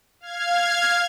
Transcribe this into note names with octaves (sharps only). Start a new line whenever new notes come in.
F5 F6 G#6